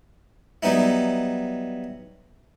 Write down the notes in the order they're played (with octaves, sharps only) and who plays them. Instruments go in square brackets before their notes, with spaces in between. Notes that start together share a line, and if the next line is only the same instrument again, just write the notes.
[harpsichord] F#3 G3 B3 D#4 E4